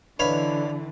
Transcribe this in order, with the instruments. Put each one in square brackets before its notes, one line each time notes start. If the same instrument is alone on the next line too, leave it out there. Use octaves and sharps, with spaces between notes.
[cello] D3 E3 [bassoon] D4 [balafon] B4 D#5 [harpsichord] C#5 F5 B5